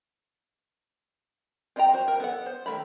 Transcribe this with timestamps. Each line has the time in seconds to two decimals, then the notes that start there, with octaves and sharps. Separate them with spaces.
1.76 C4 F4 D#5 G5 A#5
1.93 F#4 C5
2.08 A#4
2.20 B3 A4 F#5
2.46 C5
2.66 D#3 A3 A#5 B5